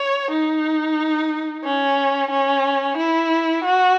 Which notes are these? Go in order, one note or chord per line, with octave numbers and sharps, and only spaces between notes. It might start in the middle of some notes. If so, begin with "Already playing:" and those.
Already playing: C#5
D#4
C#4
C#4
E4
F#4